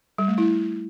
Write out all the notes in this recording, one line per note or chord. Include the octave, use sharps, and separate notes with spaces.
G3
A3
E4